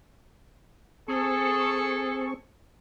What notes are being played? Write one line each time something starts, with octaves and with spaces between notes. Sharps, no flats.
C4 G#4 A4 C#6